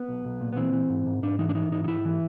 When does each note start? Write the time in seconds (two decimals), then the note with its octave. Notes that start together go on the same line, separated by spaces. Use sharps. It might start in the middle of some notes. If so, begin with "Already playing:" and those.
Already playing: B3
0.09 B1
0.25 B1
0.41 A#2
0.53 B3
0.57 E3 C4
0.73 E3
0.90 G#2
1.06 G#2
1.23 G#2 D4
1.39 E3 D#4
1.49 D4
1.55 E3 D#4
1.72 G#2 D#4
1.84 D#4
1.88 G#2 E4
2.05 E3